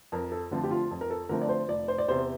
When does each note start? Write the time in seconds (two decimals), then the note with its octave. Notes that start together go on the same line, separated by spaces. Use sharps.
0.12 F2 A#4
0.32 A4
0.51 D3 F3 A3 C4 F4
0.63 G4
0.71 F4
0.91 F2
1.01 A#4
1.10 A4
1.29 D3 F3 A3 C4 A#4
1.42 D5
1.49 C5
1.68 F1 D5
1.88 C5
1.98 D5
2.08 E2 C3 C5